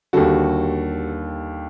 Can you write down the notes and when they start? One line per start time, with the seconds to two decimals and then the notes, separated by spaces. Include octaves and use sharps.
0.13 D#2 D3 G3 F#4 A4